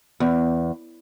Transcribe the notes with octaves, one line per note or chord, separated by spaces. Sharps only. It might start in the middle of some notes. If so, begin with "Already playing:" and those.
E2